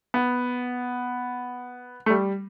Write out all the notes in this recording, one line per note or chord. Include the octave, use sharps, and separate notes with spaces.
B3
A3
G3